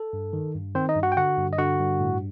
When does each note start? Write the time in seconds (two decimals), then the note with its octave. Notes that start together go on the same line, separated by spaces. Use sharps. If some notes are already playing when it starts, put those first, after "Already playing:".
Already playing: A4
0.13 G2
0.33 D#3
0.55 G2
0.75 D#3 C4 C5
0.89 D#4 D#5
0.96 G2
1.03 F#4 F#5
1.12 G5
1.17 D3 F#4 F#5
1.38 G2
1.53 D#5
1.58 D3 F#4 F#5
1.79 G2
2.00 A2